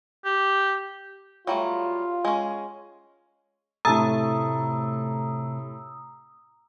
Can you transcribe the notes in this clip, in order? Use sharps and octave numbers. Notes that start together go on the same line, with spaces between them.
G4
F#3 G3 A3 F4
G#3 C#4
A2 C3 A3 A5 A#5 D#6 E6 A6